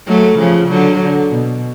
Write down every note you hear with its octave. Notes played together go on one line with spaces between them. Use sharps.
F#3 A3
C#3 F3
D3 F#3
D3
B2